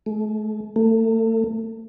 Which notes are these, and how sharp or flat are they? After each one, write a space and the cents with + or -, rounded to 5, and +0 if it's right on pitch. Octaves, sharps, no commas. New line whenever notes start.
A3 -40
A3 +35